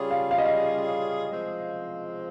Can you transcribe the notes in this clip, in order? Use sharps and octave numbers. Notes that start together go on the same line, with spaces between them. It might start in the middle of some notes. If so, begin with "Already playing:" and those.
Already playing: C#3 G3 C#4 F4 G#4 C#5
F5
F5
D#5
F5
F3 G#3 C4